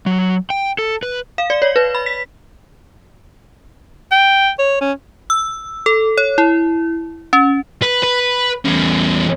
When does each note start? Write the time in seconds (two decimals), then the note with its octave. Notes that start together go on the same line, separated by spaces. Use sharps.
0.06 F#3
0.50 G5
0.79 A4
1.03 B4
1.38 F5
1.50 D5
1.62 C#5
1.76 B4
1.95 B5
2.06 B6
4.12 G5
4.59 C#5
4.81 C#4
5.30 E6
5.86 A4
6.18 C#5
6.38 E4
7.33 C#4
7.82 B4
8.04 B4
8.65 E2 C#4